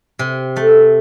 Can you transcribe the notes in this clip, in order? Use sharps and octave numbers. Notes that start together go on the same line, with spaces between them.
C3
A3